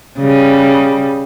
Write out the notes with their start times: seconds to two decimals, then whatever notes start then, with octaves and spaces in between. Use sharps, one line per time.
0.19 C#3 G3